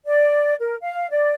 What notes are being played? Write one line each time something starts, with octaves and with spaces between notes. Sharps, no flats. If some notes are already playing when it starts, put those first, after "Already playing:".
D5
A#4
F5
D5